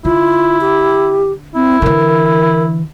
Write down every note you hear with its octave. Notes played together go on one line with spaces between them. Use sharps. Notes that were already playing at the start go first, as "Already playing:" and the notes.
D3 E4 F4
G4
C4 E4
D3 E3 A#4